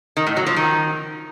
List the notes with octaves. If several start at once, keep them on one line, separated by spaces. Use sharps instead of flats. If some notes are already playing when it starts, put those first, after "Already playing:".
D#3
A2
F#3
F3
D#3